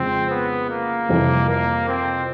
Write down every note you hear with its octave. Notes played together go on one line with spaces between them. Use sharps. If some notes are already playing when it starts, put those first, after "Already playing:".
Already playing: F2 C#3 F3 G#3 C4
B3
A#3
F2 C3 E3 G3
A#3
C4